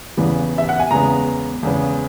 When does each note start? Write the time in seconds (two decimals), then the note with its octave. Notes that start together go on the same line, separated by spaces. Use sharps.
0.17 E2 C#3 E3 B3
0.58 E5
0.69 F#5
0.80 G#5
0.91 E2 C#3 G#3 B3 A#5
1.63 E2 C#3 G#3 B3